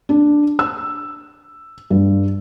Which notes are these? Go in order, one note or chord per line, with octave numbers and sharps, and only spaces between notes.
D4
E6
G2